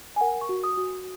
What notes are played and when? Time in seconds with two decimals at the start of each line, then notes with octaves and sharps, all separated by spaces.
0.16 G#5
0.21 A#4 F#5
0.41 C#6
0.49 F#4
0.64 D#6
0.78 F#4